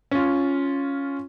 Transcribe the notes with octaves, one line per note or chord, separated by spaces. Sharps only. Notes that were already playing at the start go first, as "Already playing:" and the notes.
C#4 F4